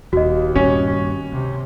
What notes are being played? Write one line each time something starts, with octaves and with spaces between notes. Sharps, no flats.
D#1 D#2 F#4 D#5
G2 A#2 C#4
C#2 C3